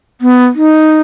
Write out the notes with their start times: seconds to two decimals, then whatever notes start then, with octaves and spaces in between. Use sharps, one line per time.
0.21 B3
0.55 D#4